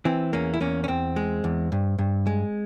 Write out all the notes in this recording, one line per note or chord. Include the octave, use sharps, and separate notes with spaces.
E3 C4
E2 A#3 C#4
E4
E2 A#3 C#4
C#4
E2 C4
G#3
E2
G2
G2
G#3